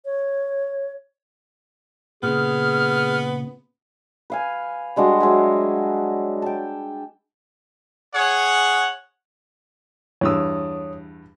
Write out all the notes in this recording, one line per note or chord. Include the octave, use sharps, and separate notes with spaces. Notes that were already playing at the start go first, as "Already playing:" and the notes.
C#5
A#2 C#3 B3 G#4 F6
B4 F5 G#5
G3 G#3 D4 F#4
F#3 G#3 E5 G#5
G5 A5
G#4 C#5 F#5
E2 G2 C#5 D#6 E6